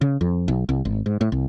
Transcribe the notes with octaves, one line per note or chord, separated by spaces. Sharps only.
C#3
F2
B1
C2
G#1
G#2
A2
C2